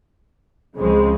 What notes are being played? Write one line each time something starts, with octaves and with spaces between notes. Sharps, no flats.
C#2 C#3 F3 G#3 C4